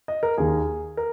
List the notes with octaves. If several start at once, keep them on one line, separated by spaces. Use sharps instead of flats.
D#5
A#4
D#2 D#3 G#4
A#4